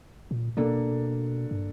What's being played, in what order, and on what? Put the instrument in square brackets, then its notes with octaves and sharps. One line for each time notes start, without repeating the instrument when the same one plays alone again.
[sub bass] A#2
[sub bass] B2 [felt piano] A#3 D4 A4
[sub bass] G2